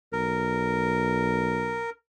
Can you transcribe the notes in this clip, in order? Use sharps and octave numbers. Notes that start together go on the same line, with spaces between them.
B1 A#4